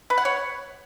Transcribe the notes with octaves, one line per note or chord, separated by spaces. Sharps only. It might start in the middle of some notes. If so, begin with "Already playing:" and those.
B4
F#5
C#5